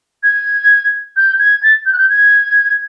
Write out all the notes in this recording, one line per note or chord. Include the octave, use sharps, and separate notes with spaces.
G#6
G6
G#6
A6
G6
F#6
G6
G#6